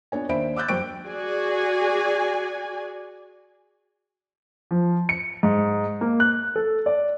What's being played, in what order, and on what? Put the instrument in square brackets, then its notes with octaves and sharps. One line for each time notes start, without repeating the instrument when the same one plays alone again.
[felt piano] B3 D4 C#5 G#5
D#2 D4 C5 E5 B5 D7
D6 E6 F#6 G6 A6
F#2 G3 C5 G5 C#6 D7
[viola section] F#4 G#4 D5 G#5
[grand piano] F3
C#7
G#2
A#3
F#6
A4
D5